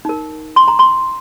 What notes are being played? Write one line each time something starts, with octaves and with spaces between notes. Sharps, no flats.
D#4 A#4
C6
A#5
C6